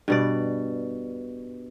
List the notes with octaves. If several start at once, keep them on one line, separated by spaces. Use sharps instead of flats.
G2 B2 D5